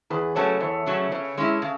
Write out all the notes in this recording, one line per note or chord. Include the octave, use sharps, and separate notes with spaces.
E2 G#4 B4
C#3 F#3 A3 C#4 A4 C#5
E2 C#5 E5
C#3 F#3 A3 C#4
C#3 C#5 E5
G#3 C#4 E4
C#3